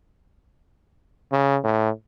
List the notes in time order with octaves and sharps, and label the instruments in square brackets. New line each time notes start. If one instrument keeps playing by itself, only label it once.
[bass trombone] C#3
A2